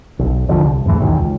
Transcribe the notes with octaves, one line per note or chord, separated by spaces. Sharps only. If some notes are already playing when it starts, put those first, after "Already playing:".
B1
E1 D3 F3
C2
E2 G#2 E3 A3
B1 E2 D#3
C#2